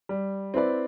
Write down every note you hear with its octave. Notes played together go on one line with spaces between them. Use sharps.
G3
C4 E4 B4 D5